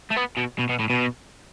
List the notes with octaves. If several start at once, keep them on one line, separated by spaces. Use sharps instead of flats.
A3
B3
B2
B2
B2
A2
B2